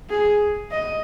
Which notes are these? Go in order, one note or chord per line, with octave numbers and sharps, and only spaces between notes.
G#4
D#5